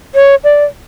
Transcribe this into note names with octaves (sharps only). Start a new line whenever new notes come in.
C#5
D5